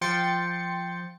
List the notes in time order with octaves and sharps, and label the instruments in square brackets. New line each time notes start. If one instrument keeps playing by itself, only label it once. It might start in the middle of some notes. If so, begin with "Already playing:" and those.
[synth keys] F3 G5 C6 A6 C#7